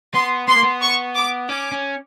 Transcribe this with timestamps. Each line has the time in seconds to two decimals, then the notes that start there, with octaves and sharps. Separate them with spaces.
0.14 B3 C6
0.48 B3 C6
0.55 A#3
0.63 B3
0.82 C#6
1.16 D6
1.49 C#4 D6
1.72 C#4